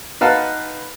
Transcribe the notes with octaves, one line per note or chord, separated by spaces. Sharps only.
D#4 B4 F5 F#5 A5 C6